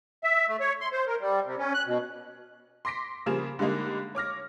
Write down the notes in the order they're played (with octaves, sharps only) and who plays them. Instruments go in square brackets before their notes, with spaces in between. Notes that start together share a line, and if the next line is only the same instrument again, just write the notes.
[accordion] E5
A3
C#5
C6
C5
A#4
G3
C3
C#4
F#6
B2
[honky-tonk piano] C6 D6 A#6 B6 D7
C#3 F3 G3 A#3 G#4 E7
D3 G3 G#3 A#3 D#4
C#5 D6 F6 A#6